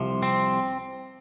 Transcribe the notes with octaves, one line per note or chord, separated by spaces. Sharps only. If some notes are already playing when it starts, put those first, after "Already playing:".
Already playing: C2 C3 F3
C4